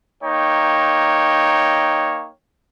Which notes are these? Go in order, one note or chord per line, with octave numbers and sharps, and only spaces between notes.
A#3 D#4 C#5 G5